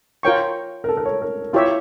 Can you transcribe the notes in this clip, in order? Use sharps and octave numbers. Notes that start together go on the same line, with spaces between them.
F4 A#4 C#5 G5 C#6
A#4
A4
A#4
C#5
A#4
E4 F4 G4 C#5 E5